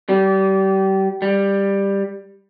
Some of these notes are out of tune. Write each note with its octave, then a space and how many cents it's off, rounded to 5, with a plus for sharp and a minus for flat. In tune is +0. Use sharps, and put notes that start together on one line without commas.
G3 -30
G3 +10